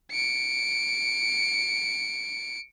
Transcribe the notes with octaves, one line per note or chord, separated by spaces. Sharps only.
C#7 D7